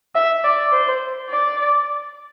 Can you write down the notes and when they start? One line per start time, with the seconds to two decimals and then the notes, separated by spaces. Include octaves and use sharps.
0.15 E5
0.44 D5
0.73 C5
1.30 D5